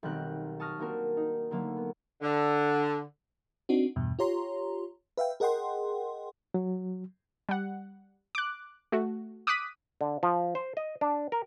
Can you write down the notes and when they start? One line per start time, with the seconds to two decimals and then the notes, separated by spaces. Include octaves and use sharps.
0.03 B1 D#3 G3 C4 F#6
0.60 A5 C#6 D#6 F6 A#6
0.79 A#3 C4 D4 F#4 A#4
1.17 D#4
1.51 D3 F#3 A3 A#3
1.76 B3
2.22 D3
3.69 C4 D4 D#4 F#4
3.96 E2 G2 B2
4.19 F4 G4 C#5 A#5 C6
5.17 B4 E5 F5 G5
5.40 G#4 A#4 D#5 F#5 G5 C6
6.54 F#3
7.49 G3 F#5
8.35 D6 F#6
8.92 A3 F#4
9.47 D6 D#6 F#6 B6 D#7
10.01 D3
10.23 F3
10.55 C5
10.77 D#5
11.01 D4
11.32 A#4